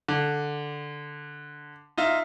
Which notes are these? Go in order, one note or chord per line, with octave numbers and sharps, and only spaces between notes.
D3
D#4 F4 E5